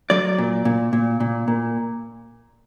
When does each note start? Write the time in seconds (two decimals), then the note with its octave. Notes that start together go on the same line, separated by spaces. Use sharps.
0.10 F#3 D5
0.38 A#2
0.65 A#2
0.93 A#2
1.20 A#2
1.48 A#2